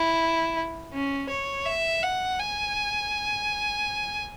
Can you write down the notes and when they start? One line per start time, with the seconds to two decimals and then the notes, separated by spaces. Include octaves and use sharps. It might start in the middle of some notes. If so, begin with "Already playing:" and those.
Already playing: E4
0.93 C#4
1.29 C#5
1.66 E5
2.03 F#5
2.39 G#5